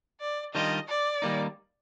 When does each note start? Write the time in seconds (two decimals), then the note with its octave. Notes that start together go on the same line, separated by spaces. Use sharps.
0.20 D5
0.54 D#3 G3 D4 F4 D#5
0.88 D5
1.22 D#3 G3 A#3 D#4